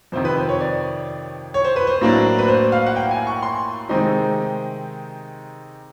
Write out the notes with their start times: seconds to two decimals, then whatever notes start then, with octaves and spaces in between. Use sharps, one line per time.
0.12 F2 C3 D#3 C5
0.25 B4
0.37 C5
0.49 C#5
0.60 D5
1.54 C#5
1.65 C5
1.76 B4
1.87 C5
2.01 A2 F#3 A#3 D4
2.38 B4
2.48 C5
2.72 F5
2.86 F#5
2.96 G5
3.11 G#5
3.27 C#6
3.43 C6
3.89 C3 D#3 G#3 C4 D#4